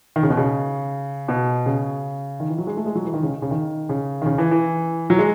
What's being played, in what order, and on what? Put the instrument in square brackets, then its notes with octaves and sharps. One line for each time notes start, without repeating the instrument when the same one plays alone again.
[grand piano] D#3
C#3
B2
C#3
B2
C#3
D#3
E3
F#3
G#3
A3
G#3
F#3
E3
D#3
C#3
C#3
D#3
C#3
D#3
C#3
E3
E3
F#3
G#3